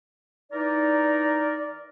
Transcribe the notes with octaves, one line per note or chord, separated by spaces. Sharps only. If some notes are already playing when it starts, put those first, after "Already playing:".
E3 D#4 A#4 D5